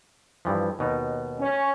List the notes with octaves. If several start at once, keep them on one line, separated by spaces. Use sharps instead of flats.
G2 E3 F3
D#2 B2 D#4
C#4